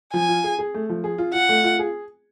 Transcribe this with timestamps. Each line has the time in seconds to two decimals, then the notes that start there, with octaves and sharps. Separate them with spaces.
0.13 F3 G#5
0.28 F4
0.44 G#4
0.59 G#4
0.74 A3
0.89 F3
1.04 G#4
1.18 F4
1.34 F4 F#5
1.49 A3
1.64 F4
1.79 G#4